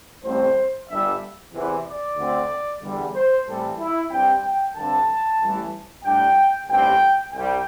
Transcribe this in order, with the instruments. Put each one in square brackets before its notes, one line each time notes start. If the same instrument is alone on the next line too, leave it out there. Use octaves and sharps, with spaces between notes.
[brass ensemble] A1 A2 G3 C4 C5
G1 G2 G3 D4 E5
E2 C3 E3
D5
D2 D3 C4
E2 D3 G3
C5
A2 E3 G3 C4 A4
E4
G2 G3 C4 G5
G5
G2 D3 C4 A5
A1 A2 E3 G3
A2 G3 D4 G5
A1 G2 G3 C4 G5
C2 C3 G3 G5